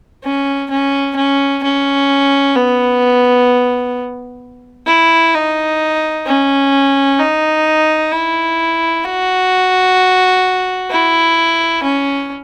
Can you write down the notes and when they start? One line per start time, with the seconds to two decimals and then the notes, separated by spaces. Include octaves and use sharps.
0.24 C#4
0.70 C#4
1.16 C#4
1.63 C#4
2.56 B3
4.87 E4
5.34 D#4
6.26 C#4
7.19 D#4
8.12 E4
9.05 F#4
10.91 E4
11.83 C#4